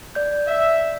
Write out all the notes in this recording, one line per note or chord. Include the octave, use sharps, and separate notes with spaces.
D5 G6
E5